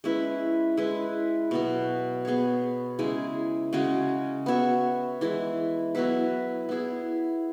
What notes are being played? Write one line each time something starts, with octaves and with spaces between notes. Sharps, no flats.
G#3 C#4 E4 B4
G#3 E4 B4
B2 F#3 B3
B3 G#4 C#5
C#3 G#3 E4 G#4
C#3 G#3 C#4 F#4
B3 F#4 C#5 E5
E3 G#3 E4
F#3 B3 E4 B4
B3 E4 G#4